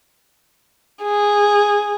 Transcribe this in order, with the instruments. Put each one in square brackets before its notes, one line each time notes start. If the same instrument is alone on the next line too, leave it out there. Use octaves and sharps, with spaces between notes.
[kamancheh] G#4